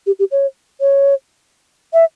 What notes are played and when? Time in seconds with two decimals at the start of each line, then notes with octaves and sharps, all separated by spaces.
0.07 G4
0.19 G4
0.32 C#5
0.81 C#5
1.93 E5